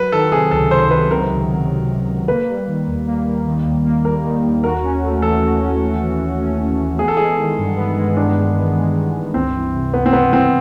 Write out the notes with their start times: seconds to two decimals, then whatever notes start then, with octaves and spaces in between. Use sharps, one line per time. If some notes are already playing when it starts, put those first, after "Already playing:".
Already playing: F#3 B4
0.12 D#3 A4
0.32 C3 G#4
0.51 C#2 A4
0.71 F#3 C5
0.90 D#3 B4
1.11 C3 A#4
1.31 C#2
1.49 F#3
1.70 D#3
1.88 C3
2.09 C#2
2.28 A#3 B4
2.48 G3
2.67 D#3
2.87 D#2
3.07 A#3
3.26 G3
3.46 D#3
3.66 D#2
3.85 A#3
4.05 G3 A#4
4.24 D#3
4.43 D#2
4.64 F#4 A#4
4.83 C#4
5.03 A3
5.22 E3 A4
5.42 F#4
5.62 C#4
5.81 A3
6.01 E3
6.21 F#4
6.40 C#4
6.60 A3
6.79 E3
6.99 B3 G#4
7.08 A4
7.17 G#3 G#4
7.38 D#3
7.58 G2
7.77 B3
7.97 G#3
8.16 D#3 D4
8.36 G2
8.55 B3
8.76 G#3
8.95 D#3
9.14 G2
9.34 C#2 C4
9.55 E3
9.73 C3
9.93 C#2 B3
10.06 C4
10.13 C#2 B3
10.33 E3 C4